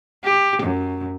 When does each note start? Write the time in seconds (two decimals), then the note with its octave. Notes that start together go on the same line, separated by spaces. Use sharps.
0.24 G4
0.63 F#2